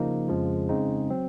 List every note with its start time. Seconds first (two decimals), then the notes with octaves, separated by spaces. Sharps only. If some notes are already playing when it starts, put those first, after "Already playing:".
Already playing: C#3 F3 A#3 D#4
0.28 F2 C#3 F3 G#3
0.69 C#3 G#3 C4 D#4
1.10 F#3 C4